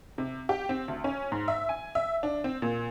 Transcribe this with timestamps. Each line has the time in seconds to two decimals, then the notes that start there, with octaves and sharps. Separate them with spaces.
0.18 C3
0.49 G4
0.69 C4
0.88 D2
1.04 C#4
1.32 G#2
1.48 E5
1.69 G#5
1.95 E5
2.23 D4
2.44 C4
2.62 A#2